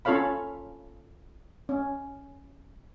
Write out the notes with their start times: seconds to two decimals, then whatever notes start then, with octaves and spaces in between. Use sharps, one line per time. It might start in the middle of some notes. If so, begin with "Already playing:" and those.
0.05 C#4 F4 A4 C#5 F5 B5
1.69 C#4